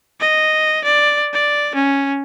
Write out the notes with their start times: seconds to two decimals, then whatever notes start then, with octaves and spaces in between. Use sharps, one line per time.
0.20 D#5
0.85 D5
1.33 D5
1.75 C#4